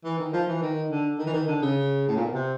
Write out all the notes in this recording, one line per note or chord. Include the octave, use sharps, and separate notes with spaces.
E3
D#3
F3
E3
D#3
D3
D#3
E3
D#3
D3
C#3
A2
A#2
B2
C3